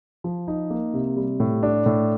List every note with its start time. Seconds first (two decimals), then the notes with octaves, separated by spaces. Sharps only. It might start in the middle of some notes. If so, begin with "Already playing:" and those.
0.24 F3
0.48 D#4
0.70 A#3
0.94 C3
1.17 G3
1.40 A2
1.63 D4
1.86 A2